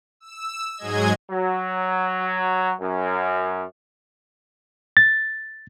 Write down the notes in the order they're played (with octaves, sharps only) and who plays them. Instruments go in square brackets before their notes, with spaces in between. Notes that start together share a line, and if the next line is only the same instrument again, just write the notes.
[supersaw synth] E6
G#2 F#3 G#3 G#4 D#5 G#6
[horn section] F#3
F#2
[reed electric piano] A6